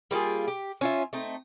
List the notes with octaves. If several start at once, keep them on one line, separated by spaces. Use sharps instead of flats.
G3 A#3 F4 G#4
G4
C#4 F4 E5
A3 C4 D#4